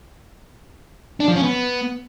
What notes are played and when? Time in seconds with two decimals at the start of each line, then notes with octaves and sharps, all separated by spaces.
1.20 D4
1.28 F3
1.36 C#4
1.43 B3